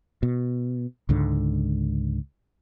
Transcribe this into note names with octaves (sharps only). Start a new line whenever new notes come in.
B2
C#2 G#2 D3